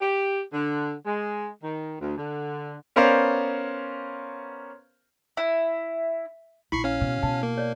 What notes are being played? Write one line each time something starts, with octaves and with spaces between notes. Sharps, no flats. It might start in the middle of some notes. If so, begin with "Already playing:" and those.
G4
D3
G#3
D#3
D2
D3
B3 C#4 A#4 C5 D5 F5
E4
A#1 E4 B5 C#6 C7
C#4 F5
B2
B2 A5
A#3
C#5 D5